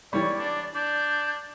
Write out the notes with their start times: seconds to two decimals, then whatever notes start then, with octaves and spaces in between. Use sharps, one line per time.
0.13 E3 G3 C#5 D5
0.38 D4
0.75 D4 G6